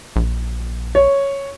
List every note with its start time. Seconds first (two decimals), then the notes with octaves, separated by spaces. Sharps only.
0.16 A#1
0.95 C#5